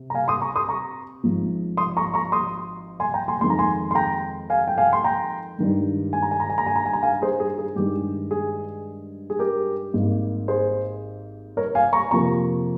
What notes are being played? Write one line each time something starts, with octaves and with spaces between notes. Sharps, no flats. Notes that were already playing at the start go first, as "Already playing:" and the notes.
Already playing: C3
A#5
F5 G#5
C6 D#6
A#5 C#6
C6 D#6
A#5 C#6
G#1 G#2 F3 G#3
C6 D#6
A#5 C#6
A#5 C#6
C6 D#6
G#5 C6
G5 A#5
G#5 C6
F2 D#3 G#3 C6
A#5
G#5 C6
C6
G5 A#5
F5 G#5
G5
F5 G#5
C6
G5 A#5
G2 D#3 G#3
G#5
A#5
G#5
A#5
G#5
A#5
G#5
A#5
G#5
A#5
F5 G#5
G#4 C5
G#4
G#4
G2 D#3 G#3 G4
G#4
G#4
G4 A#4
G#1 G#2 G3 A#3
G#4 C5
A#4 C#5
F5 G#5
A#5 C#6
F2 C3 F3 A#3 A#5 C#6